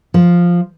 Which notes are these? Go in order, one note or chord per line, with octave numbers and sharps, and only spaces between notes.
F3